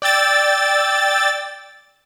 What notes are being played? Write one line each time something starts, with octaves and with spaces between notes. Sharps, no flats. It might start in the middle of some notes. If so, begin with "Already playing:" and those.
D5 G5 E6 A6